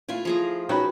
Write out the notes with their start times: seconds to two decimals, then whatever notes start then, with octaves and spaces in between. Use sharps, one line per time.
0.09 A3 E4 F4 G#5
0.25 F3 G#4 A#5
0.69 C4 C#4 D#4 F#4 B4 B5